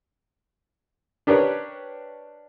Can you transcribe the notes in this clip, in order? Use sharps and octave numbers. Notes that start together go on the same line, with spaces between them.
D4 G4 A#4 B4 C#5